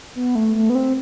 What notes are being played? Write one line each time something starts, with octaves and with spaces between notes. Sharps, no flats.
B3
A3
A3
B3
C4